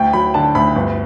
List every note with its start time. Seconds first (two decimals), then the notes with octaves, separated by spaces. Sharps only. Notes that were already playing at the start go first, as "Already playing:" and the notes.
Already playing: D2 G5
0.13 F#3 B5
0.34 D3 A5
0.55 D2 B5
0.76 G1